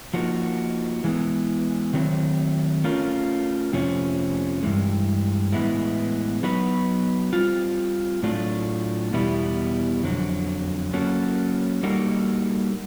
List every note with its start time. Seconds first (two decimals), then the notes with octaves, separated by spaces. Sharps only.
0.14 F3 A#3 D#4 F#4
1.04 E3 G#3 B3
1.93 D#3 F#3 A3 C4
2.84 A3 C#4 F4 A#4
3.73 F2 C3 F3 A3 C#4
4.63 G2 E3 G#3
5.53 A2 E3 G#3 B3 E4
6.43 F#3 B3 D#4 F#4 B4
7.33 G3 C4 F4
8.23 A2 F#3 A3 D4 F4
9.13 E2 B2 G3 B3 E4
10.03 F2 D3 F#3
10.93 F#3 A#3 C#4 F#4 A4
11.83 G3 A#3 D#4 F#4 A4